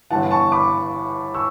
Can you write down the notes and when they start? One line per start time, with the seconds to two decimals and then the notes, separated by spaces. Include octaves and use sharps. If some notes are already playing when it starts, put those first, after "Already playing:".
0.10 G1 G2 E3 F#5 A5
0.31 A5 C#6
0.52 B5 D6
1.34 C#6 E6